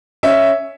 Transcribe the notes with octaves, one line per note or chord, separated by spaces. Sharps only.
C#4 E5